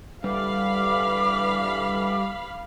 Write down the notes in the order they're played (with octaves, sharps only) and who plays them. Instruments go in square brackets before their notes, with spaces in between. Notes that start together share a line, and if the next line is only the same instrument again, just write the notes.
[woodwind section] D3 E3 [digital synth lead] G3 [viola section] F5 B5 [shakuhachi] D6